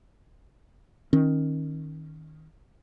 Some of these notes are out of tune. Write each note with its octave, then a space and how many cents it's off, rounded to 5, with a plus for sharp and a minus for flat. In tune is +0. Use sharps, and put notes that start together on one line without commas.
D#3 +0 C#4 -30